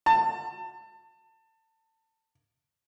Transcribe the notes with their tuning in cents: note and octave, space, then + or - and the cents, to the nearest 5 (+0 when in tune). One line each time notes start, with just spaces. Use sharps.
A5 +25